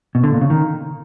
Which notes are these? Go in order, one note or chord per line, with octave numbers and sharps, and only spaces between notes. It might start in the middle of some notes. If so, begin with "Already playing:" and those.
B2
D3
A#2
C#3
D#3